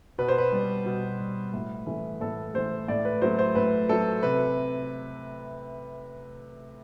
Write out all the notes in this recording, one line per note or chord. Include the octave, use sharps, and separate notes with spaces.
B2 B4
C5
B4
G3
B2
G3
A2
E3 A3
A2 A4
E3 A3 C5
A2 D5
B4
F#3 A3 C5
C5
A2 B4
F#3 A3 A4
C3 B4